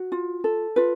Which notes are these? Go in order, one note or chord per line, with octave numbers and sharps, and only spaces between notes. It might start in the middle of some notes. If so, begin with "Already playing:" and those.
Already playing: F#4
F4
A4
F4 B4